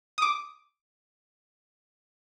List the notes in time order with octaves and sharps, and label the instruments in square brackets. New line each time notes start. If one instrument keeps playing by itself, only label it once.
[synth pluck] D6 D#6